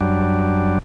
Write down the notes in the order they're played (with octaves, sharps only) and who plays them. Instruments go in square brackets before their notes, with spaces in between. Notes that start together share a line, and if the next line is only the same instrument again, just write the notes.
[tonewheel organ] F#2 F#3 G3 D4